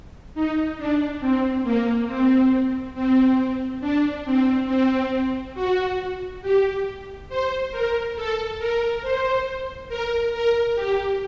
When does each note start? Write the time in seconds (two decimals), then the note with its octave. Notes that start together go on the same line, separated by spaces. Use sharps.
0.34 D#4
0.78 D4
1.20 C4
1.64 A#3
2.07 C4
2.95 C4
3.81 D4
4.25 C4
4.68 C4
5.54 F#4
6.42 G4
7.29 C5
7.72 A#4
8.16 A4
8.59 A#4
9.02 C5
9.89 A#4
10.33 A#4
10.75 G4